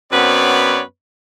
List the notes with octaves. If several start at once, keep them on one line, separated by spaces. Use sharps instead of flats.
F#2 B3 C4 B4 C#5 D5